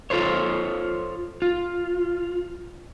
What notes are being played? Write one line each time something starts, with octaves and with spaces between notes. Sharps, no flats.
F4 A4 C5 C#5
F4